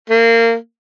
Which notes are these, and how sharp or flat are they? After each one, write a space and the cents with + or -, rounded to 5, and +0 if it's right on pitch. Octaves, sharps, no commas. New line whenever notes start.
A#3 -25